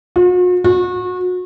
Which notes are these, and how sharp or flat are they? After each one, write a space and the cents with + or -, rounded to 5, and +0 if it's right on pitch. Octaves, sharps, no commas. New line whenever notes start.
F#4 -45
F#4 -30